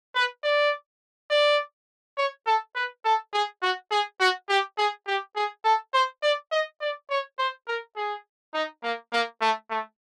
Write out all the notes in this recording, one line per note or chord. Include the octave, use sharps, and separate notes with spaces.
B4
D5
D5
C#5
A4
B4
A4
G#4
F#4
G#4
F#4
G4
G#4
G4
G#4
A4
C5
D5
D#5
D5
C#5
C5
A#4
G#4
D#4
A#3
A#3
A3
A3